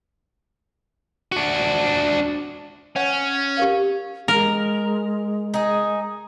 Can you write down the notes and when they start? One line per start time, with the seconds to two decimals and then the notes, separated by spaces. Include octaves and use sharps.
1.32 D4 F#4
2.96 C#4 C#5 F#5
3.57 G4 A#4 F5
4.28 G#3 A#4
5.54 D#4 G#4